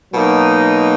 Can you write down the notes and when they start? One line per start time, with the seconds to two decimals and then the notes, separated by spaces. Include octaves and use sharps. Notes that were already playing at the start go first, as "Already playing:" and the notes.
0.12 B2 F#3 A#3 D#4